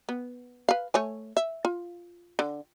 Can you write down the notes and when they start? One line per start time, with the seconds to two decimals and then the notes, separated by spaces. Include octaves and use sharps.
0.09 B3
0.69 B4 F5
0.94 A3 C#5 G#5
1.37 E5
1.65 F4
2.39 D3